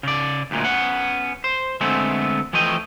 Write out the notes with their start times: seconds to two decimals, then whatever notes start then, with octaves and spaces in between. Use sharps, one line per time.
0.03 C#3 D5
0.51 D2 A#2 G#3
0.65 B3 C#4 F#5
1.44 C5
1.81 D3 G#3 A3 B3 C4
2.53 E3 F3 A3 D#5 G5